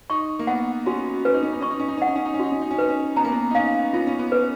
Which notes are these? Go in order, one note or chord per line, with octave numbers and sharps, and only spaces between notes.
D#4 C#6
A#3
B3 F#5
C#4 F#4
C#4 B4
D#4
C#4
D#4
C#4 C#6
D#4
C#4
D#4
C#4
D#4 F#5
C#4
D#4
C#4
D#4 F#4
C#4
D#4
C#4
D#4 B4
C#4
B3 A#5
A#3
B3
D#4
C#4 F5
B3 F4
C#4
B3
B4